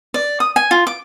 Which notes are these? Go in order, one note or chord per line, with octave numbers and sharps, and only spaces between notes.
D5
D#6
G#5
F4
D6